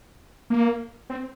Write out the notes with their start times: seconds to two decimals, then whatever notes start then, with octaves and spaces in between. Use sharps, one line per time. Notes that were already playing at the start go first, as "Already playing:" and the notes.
0.50 A#3
1.10 C4